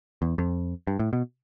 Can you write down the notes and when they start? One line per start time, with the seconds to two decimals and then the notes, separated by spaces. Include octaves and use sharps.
0.22 E2
0.38 F2
0.87 G2
0.99 A2
1.13 B2